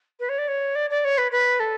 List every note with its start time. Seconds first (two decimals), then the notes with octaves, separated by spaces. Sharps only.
0.20 B4
0.29 C#5
0.38 D5
0.48 C#5
0.75 D5
0.90 D5
1.05 C#5
1.18 B4
1.32 B4
1.60 A4